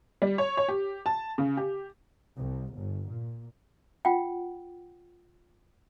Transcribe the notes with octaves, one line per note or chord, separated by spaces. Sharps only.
G3
C#5
C#5
G4
A5
C#3
G4
C2
G1
A#2
F4 F#5 G5